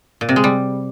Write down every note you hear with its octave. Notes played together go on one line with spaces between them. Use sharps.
A#2
C3
G#3
G3